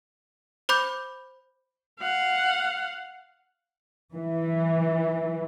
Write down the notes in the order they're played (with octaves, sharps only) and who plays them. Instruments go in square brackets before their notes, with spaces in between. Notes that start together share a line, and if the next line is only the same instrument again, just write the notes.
[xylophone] C5 B5 D6 G6
[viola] F5 F#5
[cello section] E3